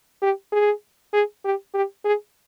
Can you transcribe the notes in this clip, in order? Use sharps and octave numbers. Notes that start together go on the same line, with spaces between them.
G4
G#4
G#4
G4
G4
G#4